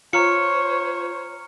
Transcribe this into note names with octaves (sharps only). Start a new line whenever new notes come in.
F4 C5 C#5 A#5 F6 C#7